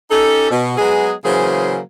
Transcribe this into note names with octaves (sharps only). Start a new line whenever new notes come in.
C#4 D#4 G4 A4
B2
F#3 G#3 B3 G#4
C#3 E3 F#3 A#3 G#4 C5